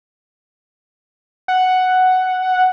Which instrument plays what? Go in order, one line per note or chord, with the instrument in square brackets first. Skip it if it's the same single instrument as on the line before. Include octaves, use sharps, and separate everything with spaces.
[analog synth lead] F#5